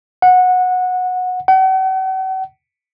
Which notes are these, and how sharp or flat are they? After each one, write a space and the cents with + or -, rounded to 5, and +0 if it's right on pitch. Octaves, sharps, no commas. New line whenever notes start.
F#5 -15
F#5 +45